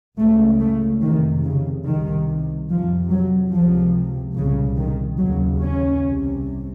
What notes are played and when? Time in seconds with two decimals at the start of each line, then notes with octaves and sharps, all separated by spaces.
0.19 C#2 C#3 A3
0.61 A3
1.03 F2 C3 D#3
1.44 C#3
1.86 C2 C3 D#3
2.69 F2 C3 F3
3.11 F#3
3.52 C#2 C3 F3
4.36 C2 A#2 C#3
4.78 D#3
5.19 D#2 C#3 F#3
5.61 C#4
6.03 C2 C3